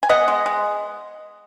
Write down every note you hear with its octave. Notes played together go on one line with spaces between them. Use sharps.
G#5
B3 D#5 F#5
G#3
G#3